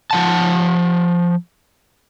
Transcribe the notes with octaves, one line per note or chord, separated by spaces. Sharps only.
F3 F#5 A5